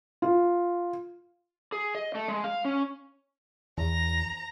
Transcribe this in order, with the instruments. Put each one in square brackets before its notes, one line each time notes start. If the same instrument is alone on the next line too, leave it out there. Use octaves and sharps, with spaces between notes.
[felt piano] F4
[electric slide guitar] G#4
D#5
A3
G#3
F5
C#4
[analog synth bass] E2 [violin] A#5